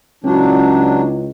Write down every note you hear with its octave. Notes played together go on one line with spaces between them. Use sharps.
C#2 F#3 C#4 D4 E4 F4